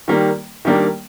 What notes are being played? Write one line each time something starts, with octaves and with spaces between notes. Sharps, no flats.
D#3 G3 A#3
D#3 G3 A#3 D4